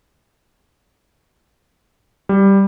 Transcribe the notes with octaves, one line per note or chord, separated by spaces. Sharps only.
G3